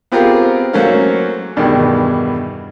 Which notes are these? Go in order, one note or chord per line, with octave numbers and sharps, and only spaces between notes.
B3 C4 F4 G4 G#4 A#4
F#3 A3 A#3 C#4 C5 F5
E2 G2 B2 D#3